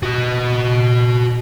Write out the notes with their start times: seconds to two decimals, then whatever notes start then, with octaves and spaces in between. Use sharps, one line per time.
0.03 F#4 D#5